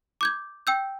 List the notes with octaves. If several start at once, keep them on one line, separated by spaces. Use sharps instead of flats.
D6 G6 G#6
G5 E6 G6